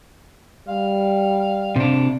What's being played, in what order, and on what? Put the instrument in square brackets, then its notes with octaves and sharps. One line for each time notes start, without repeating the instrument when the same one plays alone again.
[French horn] G3 [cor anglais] F5
[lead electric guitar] C3 D4